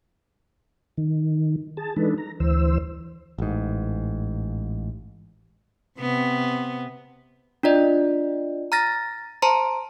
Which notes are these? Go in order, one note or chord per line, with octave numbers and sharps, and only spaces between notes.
D#3
G#4 A5
E3 G#3 D4 D#4 A4 B4
A#5
D2 E3 C5 E6
A1 G#2
C3 B3
D4 F4 D5 D#5
A#5 F6 A6 A#6
C5 A5 A#5 C6